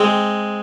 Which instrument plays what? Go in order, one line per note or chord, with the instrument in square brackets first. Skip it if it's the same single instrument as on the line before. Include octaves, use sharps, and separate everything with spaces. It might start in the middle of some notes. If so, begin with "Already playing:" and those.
Already playing: [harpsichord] G#3 C4